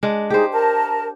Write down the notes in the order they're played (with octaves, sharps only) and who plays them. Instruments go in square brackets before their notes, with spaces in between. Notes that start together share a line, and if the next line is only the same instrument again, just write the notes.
[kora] G#3 D4
[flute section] D#4 G#4 [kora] G4 C5
[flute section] A#4 A5